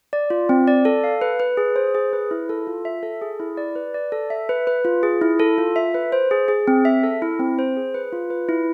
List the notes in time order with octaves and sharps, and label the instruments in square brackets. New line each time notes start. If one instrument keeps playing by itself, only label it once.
[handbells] D5
F4
C4
D5
A4
F5
B4
B4
G#4
C5
G#4
B4
E4
A4
F4
E5
A4
G#4
E4
D5
B4
D5
A4
E5
B4
B4
F4
G#4
E4
A4
F4
E5
B4
C5
G#4
G#4
C4
E5
A4
E4
C4
C5
G#4
B4
F4
B4
E4